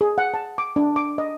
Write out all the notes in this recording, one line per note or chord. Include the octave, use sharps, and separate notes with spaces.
G#4
F#5
A5
D6
D4
D6
D#5